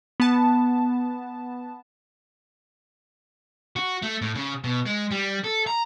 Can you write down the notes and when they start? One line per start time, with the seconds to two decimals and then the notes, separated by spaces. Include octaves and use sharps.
0.20 B3 A5
3.76 F#4
4.02 A3
4.22 A2
4.35 C#3
4.64 B2
4.86 G#3
5.11 G3
5.44 A4
5.67 A#5